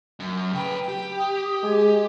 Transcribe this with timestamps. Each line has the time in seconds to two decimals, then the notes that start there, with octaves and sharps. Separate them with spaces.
0.20 F#2
0.53 C#3 B4 G5
0.89 G4
1.18 D#6
1.63 G#3 G#5